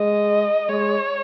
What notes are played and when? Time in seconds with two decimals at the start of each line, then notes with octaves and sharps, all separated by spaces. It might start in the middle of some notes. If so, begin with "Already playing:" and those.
Already playing: G#3 D#5
0.69 G#3 C#5